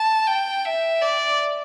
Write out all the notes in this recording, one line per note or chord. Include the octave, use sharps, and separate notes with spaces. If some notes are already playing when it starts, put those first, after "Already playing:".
Already playing: A5
G5
E5
D5